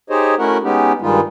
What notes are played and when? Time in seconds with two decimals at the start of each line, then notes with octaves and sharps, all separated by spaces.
0.10 D#4 G4 G#4 C5 C#5 D#5
0.39 A3 C#4 E4 F#4 A#4 F#5
0.63 G#3 B3 C#4 D#4 G4
1.02 G2 D#3 G3 G#3 D#4 F4